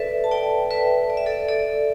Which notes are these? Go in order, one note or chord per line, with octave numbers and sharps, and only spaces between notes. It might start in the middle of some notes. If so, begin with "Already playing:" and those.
Already playing: A4 B4 D5 E5
A5
D5 G5
B4 E5
D5
E5
A4 D5
A4 D5